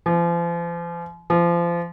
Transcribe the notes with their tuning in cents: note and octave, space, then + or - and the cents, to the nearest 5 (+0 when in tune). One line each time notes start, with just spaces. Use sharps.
F3 -40
F3 -30